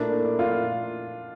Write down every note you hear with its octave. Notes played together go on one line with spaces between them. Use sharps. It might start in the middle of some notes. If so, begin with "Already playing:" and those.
Already playing: A#2 A3 D4 E4 A#4
F4